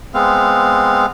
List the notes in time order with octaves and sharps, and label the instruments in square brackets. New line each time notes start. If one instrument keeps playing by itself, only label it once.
[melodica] G#3 B3 C4 F5